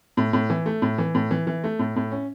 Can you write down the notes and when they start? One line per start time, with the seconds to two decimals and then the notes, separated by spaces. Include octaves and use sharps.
0.17 A2
0.33 A2
0.50 E3
0.66 A3
0.82 A2
0.98 E3
1.15 A2
1.31 E3
1.47 E3
1.64 A3
1.79 A2
1.96 A2
2.12 C#4